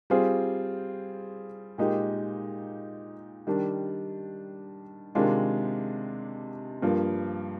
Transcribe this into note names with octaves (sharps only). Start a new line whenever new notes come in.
G3 C4 F4 G#4
A#2 G#3 D#4 G4
D#3 G3 D4
C3 D#3 G#3 D4 F4
G2 F3 A#3